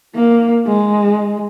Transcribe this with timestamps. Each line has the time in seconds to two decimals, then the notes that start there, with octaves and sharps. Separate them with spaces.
0.15 A#3
0.67 G#3